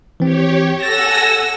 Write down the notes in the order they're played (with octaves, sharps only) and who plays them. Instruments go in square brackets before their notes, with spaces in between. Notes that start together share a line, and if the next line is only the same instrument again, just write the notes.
[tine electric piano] E3 C4 [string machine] G4 C#5
[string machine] A4 F#5 G#5 [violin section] E6 A#6 [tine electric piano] A6